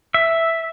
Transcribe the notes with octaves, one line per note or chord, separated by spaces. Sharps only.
E5